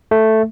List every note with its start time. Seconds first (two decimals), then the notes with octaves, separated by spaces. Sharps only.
0.11 A3